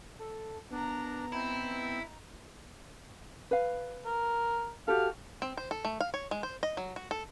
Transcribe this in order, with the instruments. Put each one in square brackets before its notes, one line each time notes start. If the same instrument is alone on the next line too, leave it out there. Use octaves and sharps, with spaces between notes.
[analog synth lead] A4
[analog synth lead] B3 [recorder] D4 [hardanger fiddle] A#4 A#5
[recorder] C4 [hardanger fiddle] D#4 [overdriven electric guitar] E4
[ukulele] B4 F5
[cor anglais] A#4
[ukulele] F#4 G4 A4 [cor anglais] F5
[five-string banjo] C4
C5
A4
A3
F5
C#5
G#3
C5
D#5
F#3
F#4
A4